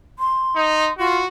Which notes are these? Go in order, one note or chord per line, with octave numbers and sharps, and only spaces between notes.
C6
D#4
F4 F#4